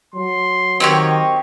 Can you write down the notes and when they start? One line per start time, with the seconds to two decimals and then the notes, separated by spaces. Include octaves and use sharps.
0.15 F#3 C6
0.80 D#3 C4 G4 C#5 D#5